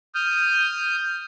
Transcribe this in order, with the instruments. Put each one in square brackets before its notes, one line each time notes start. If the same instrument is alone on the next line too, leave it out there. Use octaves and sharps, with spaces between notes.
[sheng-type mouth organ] D#6 F6 G6